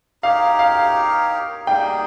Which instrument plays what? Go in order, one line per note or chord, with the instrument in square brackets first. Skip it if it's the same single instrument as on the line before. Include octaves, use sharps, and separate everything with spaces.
[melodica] D#4 G4 A#4 C#5 [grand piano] F5
[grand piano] F5
[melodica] G3 A#3 D#4 G#4 [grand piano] G5